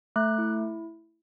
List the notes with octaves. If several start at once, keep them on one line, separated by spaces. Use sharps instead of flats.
A3 F#6
E4